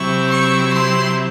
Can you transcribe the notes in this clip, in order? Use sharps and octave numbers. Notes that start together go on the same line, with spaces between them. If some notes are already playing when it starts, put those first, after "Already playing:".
Already playing: C3 F#3 C4 E4 C#6
C#6
C6